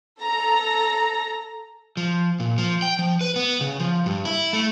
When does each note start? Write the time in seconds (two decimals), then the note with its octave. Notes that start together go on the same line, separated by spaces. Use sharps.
0.21 A4 A#5
1.97 F3
2.40 A#2
2.58 F3
2.82 G5
2.99 F3
3.21 B4
3.36 B3
3.61 C#3
3.80 F3
4.06 G2
4.25 E4
4.53 A3